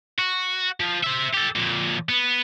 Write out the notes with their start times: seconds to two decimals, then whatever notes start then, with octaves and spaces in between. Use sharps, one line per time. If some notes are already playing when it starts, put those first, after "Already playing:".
0.19 F#4
0.80 F3
1.04 C5 E5
1.34 G4 A4
1.56 F2 A#2
2.09 B3